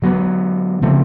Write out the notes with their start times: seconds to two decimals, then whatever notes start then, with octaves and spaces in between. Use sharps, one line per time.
0.02 D3 F#3 B3
0.82 C#3 F3 A3 C4